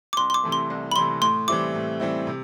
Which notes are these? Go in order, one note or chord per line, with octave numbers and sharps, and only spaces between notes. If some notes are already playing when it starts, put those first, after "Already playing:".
D6
C2 C6
C6
D6
C3 E3 A3
C6
C2
B5
C3 E3 A3 C6
A2 C6
E3 G3 C4 E4 D6
A2
E3 G3 C4 E4
C3